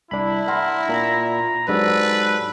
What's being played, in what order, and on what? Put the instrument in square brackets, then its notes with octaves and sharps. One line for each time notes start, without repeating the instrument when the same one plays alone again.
[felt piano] C2 [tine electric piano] D4 B5 [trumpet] E4
[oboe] A#4 [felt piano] E5 F#5 C6
[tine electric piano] A#2 [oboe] A#5
[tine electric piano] G#2 [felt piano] F#3 D4 G4 [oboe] A4 [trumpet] B4